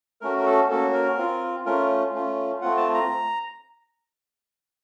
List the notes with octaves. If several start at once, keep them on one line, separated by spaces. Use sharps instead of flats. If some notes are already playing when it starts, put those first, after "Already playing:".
A3 C#4 F#4 A#4
A#4
A4
A#3 C#4 F#4 A4
A#4
C4 F4
A3 C#4 F4 A#4
A3 C#4 F4
A3 C4 F4 F#5
A5
A#5